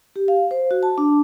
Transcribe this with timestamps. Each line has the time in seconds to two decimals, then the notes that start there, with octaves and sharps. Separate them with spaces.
0.16 G4
0.28 F5
0.51 C5
0.71 F#4
0.83 A5
0.98 D4